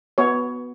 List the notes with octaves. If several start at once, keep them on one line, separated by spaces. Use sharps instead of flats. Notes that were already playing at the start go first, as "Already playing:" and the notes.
B3 F#4 C#5